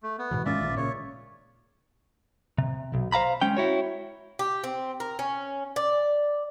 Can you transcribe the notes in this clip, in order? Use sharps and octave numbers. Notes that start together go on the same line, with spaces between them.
A3
B3
G#2 B2 E3
D#3 G#3 C#4 F4 D5 E5
A#1 G#2
A#2 C#3 C#5
C3
B1
C5 F5 A#5 B5
G#3 C#4 G5
E4 F#4 C#5
G4
C4
A#4
C#4
D5